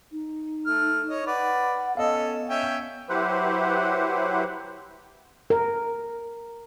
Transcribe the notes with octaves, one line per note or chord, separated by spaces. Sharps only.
D#4
A3 F6
C#5 D#5
B4 D5 F#5
B3 C#4 A4 D#5 F5
C#4 E5 G5
F#3 E4 G4 B4 C5 F#5
A#4